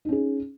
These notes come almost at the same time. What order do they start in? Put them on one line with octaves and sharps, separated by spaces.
D#4 C#4 G#4